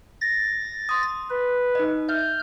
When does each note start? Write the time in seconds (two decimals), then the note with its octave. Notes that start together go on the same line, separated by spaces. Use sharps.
0.21 A6 A#6
0.89 C6 D#6
1.30 B4
1.75 D#4 D#5
2.09 E5 F6 G6